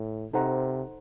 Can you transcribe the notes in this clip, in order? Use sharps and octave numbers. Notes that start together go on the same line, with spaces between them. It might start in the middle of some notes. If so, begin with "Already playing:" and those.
Already playing: A2
C3 D#4 A4 C5 F#5 A#5